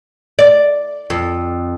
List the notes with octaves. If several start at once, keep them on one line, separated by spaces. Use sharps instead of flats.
D5
F2